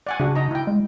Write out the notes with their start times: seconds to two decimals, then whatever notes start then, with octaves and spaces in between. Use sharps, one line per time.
0.07 D5 F#5 G#5
0.20 C#3 D4 F#4
0.35 D#4 D#5 A#5
0.51 E4 G5
0.67 G#3